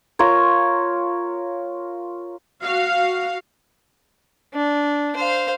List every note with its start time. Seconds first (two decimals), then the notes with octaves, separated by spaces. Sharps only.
0.19 F4 A#4 C#5
2.62 F#4 F5
4.54 D4
5.16 C5 F5